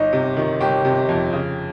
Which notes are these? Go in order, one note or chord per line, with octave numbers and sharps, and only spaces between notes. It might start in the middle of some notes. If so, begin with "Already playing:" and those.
Already playing: G1 D#4
C3
D#3
G1 G4
C3
F2
C#3